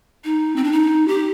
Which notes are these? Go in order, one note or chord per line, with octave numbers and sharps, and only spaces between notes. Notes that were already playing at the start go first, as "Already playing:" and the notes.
D#4
C4
D4
D#4
G4